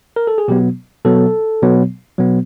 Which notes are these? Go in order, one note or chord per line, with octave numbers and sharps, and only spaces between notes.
A#4
A4
G#4
B2 F#3 B3 G4
B2 F#3 B3 A4
B2 F#3 B3
B2 F#3 B3